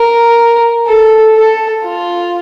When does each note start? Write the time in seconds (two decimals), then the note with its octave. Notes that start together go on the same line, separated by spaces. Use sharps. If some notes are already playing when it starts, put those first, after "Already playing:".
Already playing: A#4
0.87 A4
1.35 A4
1.83 F4